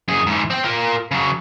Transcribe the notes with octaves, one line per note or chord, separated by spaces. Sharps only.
F#2 G#4
G#2 E3
C4 G5
F4 A#4
C#3 F#3